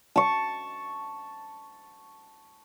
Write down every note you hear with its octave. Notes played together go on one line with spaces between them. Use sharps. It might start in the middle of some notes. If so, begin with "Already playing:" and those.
A5 C#6